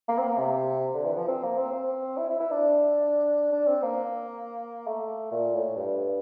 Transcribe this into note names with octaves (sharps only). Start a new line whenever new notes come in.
A#3
C4
A#3
C3
D3
E3
F3
C4
A#3
C4
C4
E4
E4
E4
D4
D4
C4
A#3
A3
A#2
A2
G2